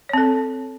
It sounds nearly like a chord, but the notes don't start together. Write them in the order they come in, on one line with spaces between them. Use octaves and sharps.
C#5 C4 A4